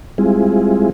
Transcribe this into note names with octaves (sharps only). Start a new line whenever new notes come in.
G3 G#3 C4 E4 F4 G#4